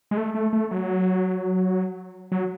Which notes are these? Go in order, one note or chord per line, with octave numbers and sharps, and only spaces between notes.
G#3
A3
A3
A3
F#3
F#3